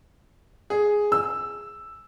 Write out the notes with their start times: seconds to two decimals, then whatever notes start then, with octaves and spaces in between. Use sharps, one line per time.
0.70 G#4
1.12 E6